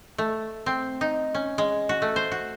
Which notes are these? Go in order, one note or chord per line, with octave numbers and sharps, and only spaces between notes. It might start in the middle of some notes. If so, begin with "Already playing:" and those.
A3
C4
D#4
C#4
G#3
F#4
A3
C5
F#4